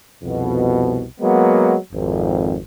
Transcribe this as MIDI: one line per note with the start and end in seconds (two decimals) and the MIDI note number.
0.22 1.03 36
0.22 1.03 41
0.22 1.03 47
1.21 1.76 54
1.21 1.76 56
1.21 1.76 58
1.21 1.76 59
1.93 2.58 32
1.93 2.58 41